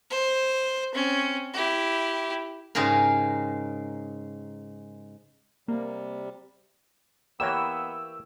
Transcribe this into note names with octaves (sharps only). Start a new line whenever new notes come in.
C5
C4 C#4
E4 G4
G#2 C#3 G4 G#4 A#4
C3 G3 A#3
E3 A#3 B3 G4 C#5 G5 E6